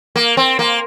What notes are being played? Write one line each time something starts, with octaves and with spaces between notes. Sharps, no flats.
A#3
C4
A#3